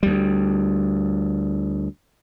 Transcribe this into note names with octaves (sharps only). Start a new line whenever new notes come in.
D2 G3